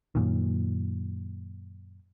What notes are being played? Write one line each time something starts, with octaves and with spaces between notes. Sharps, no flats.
F#2 A#2 D#3